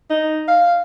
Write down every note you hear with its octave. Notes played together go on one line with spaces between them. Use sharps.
D#4
F5